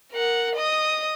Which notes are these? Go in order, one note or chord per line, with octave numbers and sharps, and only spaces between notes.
A#4 F#5
D#5 D#6